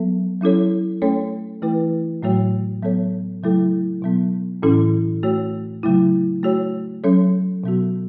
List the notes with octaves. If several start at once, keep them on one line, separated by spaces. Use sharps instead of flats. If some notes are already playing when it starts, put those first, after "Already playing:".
Already playing: F#3 B3 A4
F#3 C#4 E4 A4 C#5
A3 C#4 A4 C#5
E3 A3 E4 B4
A2 F#3 A3 F#4 C#5
F#3 B3 A4 C#5
C#3 F#3 A3 E4 A4
B2 F#3 B3
A2 E3 C#4 E4 A4
A3 F#4 C#5
C#3 F#3 A3 E4
A3 F#4 C#5
F#3 C#4 A4 C#5
B2 F#3 B3 F#4